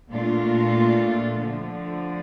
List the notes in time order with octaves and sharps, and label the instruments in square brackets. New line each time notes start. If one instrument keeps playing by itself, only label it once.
[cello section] A#2 A3 D4 F4
D3 F3 A3